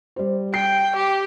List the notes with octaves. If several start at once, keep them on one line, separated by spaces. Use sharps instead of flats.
G3 C5
G5 C7
G4